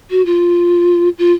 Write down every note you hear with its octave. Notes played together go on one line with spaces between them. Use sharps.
F#4
F4
F4